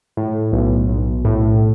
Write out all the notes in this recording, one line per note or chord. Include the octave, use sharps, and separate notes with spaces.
A2
B1
B1
A2